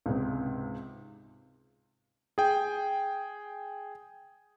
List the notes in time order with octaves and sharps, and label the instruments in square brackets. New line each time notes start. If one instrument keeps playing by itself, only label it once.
[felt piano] C#2 G#2 C3
[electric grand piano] G#4 G5